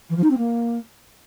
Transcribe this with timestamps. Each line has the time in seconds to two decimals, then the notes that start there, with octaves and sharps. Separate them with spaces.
0.09 E3
0.16 F3
0.23 D#4
0.30 C4
0.37 A#3